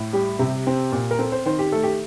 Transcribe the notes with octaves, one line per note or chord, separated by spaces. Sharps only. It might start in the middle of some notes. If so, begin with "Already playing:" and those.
Already playing: A2
G3 G4
C3
C4
A#2
A#4
C4 A4
C5
D#3 C5
G4
A3 A4
G4